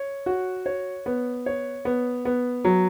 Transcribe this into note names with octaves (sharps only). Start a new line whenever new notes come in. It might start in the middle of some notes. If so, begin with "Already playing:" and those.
Already playing: C#5
F#4
C#5
B3
C#5
B3
B3
F#3